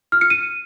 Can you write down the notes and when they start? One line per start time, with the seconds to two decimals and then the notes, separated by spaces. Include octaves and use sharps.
0.12 F6
0.21 C#7
0.30 D#7